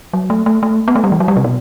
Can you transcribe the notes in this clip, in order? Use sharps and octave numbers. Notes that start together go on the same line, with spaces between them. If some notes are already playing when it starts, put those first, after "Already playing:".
F#3
A3
A3
A3
B3
A3
G3
E3
F#3
G3
C3
B2